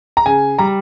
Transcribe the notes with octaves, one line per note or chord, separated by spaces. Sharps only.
A#5
C#3 G#5
G3 A#5